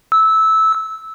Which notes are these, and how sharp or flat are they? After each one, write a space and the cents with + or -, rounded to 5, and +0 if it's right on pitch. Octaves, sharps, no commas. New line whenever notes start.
E6 -15